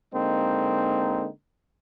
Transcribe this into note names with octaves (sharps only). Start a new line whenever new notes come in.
D3 G#3 A#3 C4 D#4